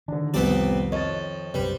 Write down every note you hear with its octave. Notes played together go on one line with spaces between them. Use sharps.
D3 D#3 D4
C2 F2 G3 B3 C4 D5
F2 C#5 D#5 A6
B1 F#2 C3 G3 B4 C5